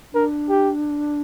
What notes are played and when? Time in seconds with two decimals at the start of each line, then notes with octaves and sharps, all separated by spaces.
0.13 D4 A#4
0.49 G4